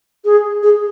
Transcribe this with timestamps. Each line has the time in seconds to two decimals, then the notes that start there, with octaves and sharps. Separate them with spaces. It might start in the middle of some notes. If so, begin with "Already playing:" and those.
0.25 G#4
0.63 G#4